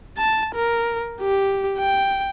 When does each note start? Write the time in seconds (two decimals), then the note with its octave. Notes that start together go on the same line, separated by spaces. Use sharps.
0.18 A5
0.55 A#4
1.21 G4
1.78 G5